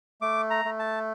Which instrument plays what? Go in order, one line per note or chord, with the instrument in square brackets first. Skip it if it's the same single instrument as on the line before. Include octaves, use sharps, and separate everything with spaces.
[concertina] A3 D6
A#5
A3
A5